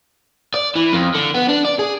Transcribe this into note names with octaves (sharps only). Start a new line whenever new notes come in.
D5
E3
F2
D3
B3
D4
D5
G#4